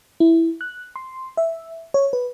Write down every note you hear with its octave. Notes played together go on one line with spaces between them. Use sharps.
E4
F#6
C6
E5
C#5
B4